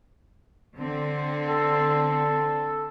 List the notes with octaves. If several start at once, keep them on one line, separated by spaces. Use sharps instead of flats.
D3 C4
A4